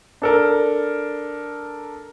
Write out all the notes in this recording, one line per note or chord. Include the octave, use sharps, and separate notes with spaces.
D4 A4 A#4